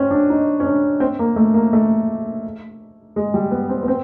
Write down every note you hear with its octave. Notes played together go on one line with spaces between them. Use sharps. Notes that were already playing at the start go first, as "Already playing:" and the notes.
Already playing: C4 C#4
D4
D#4
C#4
D4
C4
A#3
A3
A#3
A3
G#3
G3
B3
C4
B3
C4